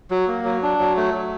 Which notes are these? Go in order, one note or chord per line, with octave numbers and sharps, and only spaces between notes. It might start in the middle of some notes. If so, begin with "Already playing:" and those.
F#3
A#3
F#3
D4
F#3
A3
F#3